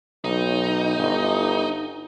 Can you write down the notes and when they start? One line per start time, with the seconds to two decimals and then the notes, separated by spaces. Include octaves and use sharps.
0.24 B1 D#4
0.98 G1